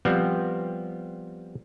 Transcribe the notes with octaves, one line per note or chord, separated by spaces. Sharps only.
F3 G3 B3 C4